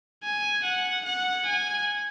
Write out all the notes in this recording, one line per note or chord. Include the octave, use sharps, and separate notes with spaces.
G#5
F#5
F#5
G#5